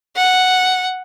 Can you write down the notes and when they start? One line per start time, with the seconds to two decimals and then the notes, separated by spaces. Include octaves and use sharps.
0.16 F#5